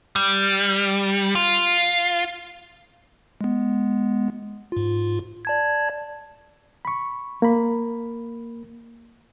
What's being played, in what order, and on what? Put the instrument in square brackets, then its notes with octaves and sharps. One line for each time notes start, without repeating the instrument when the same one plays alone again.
[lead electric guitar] G3
F4
[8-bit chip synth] G#3 B3
G#2 F4
D5 A5 G#6
[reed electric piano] B5 C#6
A#3 B5